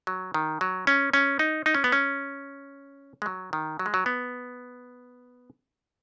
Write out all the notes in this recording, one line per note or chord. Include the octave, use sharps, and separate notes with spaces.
F#3
D#3
F#3
C#4
C#4
D#4
D#4
C#4
B3
C#4
G#3
F#3
D#3
F#3
G#3
F#3
B3